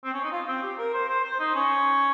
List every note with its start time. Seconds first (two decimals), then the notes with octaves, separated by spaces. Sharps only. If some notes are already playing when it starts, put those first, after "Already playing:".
0.05 C4
0.14 C#4
0.24 D#4
0.32 F4
0.48 C4
0.63 G4
0.79 A#4
0.94 C5
1.09 C5
1.24 C5
1.40 D#4
1.55 C#4